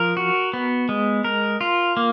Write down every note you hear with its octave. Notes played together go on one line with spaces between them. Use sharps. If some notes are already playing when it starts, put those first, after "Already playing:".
Already playing: F3 A#4
F#4
B3
G#3
A#4
F4
A#3